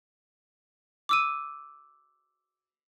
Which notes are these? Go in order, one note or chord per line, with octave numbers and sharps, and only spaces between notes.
D6 E6 D#7